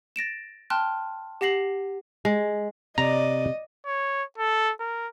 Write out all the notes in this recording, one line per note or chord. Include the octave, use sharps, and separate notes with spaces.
A6 A#6 D7 E7
G5 A5 C6 F6 F#6
G4 F#5 A#6 C7 F#7
G#3
C3 D5 D#5 A#5
C#5
A4
A#4